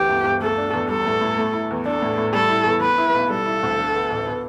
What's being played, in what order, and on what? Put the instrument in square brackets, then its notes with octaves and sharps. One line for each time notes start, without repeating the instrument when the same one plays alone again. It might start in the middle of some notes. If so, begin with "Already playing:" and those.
Already playing: [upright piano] D2 E3 [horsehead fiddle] G4
[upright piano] G1
G1
[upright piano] A3 [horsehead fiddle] A4
[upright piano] D4
E2
[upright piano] G3 [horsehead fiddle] A4
[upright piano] A2
A2
A3
E4
E2
[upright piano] D4 [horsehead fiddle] A4
[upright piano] A2
A2
[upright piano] G3 [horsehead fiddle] A4
[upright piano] E4
E2
[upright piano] B3 [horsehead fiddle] B4
[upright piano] E4
B1
[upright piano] G3 [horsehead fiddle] A4
[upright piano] E4
D2
D3
B3
A1
B3